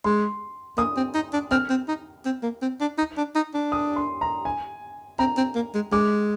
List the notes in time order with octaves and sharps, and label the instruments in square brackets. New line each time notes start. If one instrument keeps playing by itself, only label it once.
[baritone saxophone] G#3 [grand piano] C6
[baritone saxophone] A#3 [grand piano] D#6
[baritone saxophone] C4
D#4
D4
[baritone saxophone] C4 [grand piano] F6
[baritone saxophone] C4
D#4
C4
A#3
C4
D4
D#4
D4
D#4
D4
[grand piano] D#6
C6
A#5
G#5
[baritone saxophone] C4 [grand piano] A#5
[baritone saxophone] C4
A#3
G#3
[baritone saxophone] G#3 [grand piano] D6